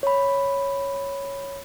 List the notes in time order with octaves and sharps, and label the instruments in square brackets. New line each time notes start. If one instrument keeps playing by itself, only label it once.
[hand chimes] C#5 B5